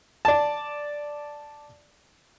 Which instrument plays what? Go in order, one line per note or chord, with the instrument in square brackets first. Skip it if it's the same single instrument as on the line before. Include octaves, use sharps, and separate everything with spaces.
[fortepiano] D5 A5